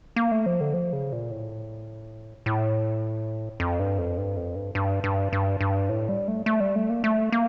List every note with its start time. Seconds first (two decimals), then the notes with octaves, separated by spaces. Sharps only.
0.16 A#3
0.32 A3
0.46 F3
0.61 D3
0.74 F3
0.93 C#3
1.12 A#2
1.31 A2
2.46 A2
3.60 F2
3.80 G2
3.98 F2
4.18 G2
4.37 F2
4.55 G2
4.75 G2
5.04 G2
5.33 G2
5.61 G2
5.89 A2
6.09 G3
6.28 A3
6.46 A3
6.60 G3
6.76 A3
6.90 A#3
7.04 A3
7.32 A#3